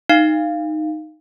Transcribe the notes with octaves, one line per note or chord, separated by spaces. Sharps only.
D#4 F5